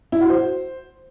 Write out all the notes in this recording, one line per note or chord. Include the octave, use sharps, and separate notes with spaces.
E4
F#4
C5